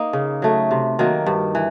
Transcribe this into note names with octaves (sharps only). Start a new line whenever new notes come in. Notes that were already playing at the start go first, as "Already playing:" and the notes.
Already playing: A#3 D#4
C#3
F#3 A3
C3
D#3 F#3 A#3
G2
E3